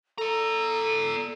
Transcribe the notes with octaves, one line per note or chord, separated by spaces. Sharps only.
A4 D5 A#5